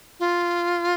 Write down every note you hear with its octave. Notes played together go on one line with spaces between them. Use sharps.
F4